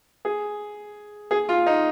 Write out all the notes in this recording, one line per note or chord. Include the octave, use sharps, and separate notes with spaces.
G#4
G#4
F4
D#4